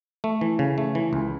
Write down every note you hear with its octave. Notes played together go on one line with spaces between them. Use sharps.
A3
E3
C#3
A3
E3
C#2